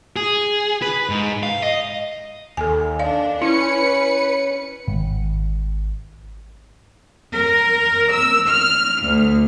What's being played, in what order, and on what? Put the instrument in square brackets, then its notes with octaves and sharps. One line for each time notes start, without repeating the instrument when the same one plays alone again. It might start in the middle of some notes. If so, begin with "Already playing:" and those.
[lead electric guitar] G#4
B4
G#2
F5
D#5
[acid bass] D#2 [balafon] A4 G#5
[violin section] D4 [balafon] D5 F5
[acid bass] C#4 [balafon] E4 [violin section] B4 C#7
[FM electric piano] G#1
[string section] A#4
E6
F6
D2